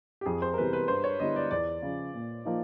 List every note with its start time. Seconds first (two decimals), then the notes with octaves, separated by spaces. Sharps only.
0.21 G4
0.26 F2 G#4
0.42 C5
0.54 A#4
0.57 C3 E3 G3 B3 B4
0.73 B4
0.88 G2 C5
1.04 C#5
1.20 D3 G3 B3 E4 D#5
1.36 D5
1.51 E2 D5
1.82 C#3 F3
2.14 A#2
2.45 F3 A#3 D#4